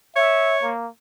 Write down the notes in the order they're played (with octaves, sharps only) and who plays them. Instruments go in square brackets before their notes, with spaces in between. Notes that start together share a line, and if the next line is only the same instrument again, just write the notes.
[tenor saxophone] C#5 [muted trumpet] E5
[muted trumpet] A#3